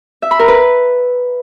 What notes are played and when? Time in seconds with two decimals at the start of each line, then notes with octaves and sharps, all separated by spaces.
0.22 E5
0.31 B5
0.39 A#4
0.48 B4